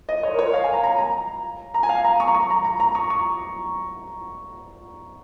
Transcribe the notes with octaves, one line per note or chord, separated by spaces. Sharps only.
D#5
C#5
A#4
C#5
F5
G#5
A#5
A#5
A#5
A#5
G#5
F5
A#5
C#6
A#5
C#6
A#5
A#5
A#5
C#6
C#6